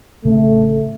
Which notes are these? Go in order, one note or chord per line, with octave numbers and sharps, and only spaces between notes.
A1 C#3 A3 C4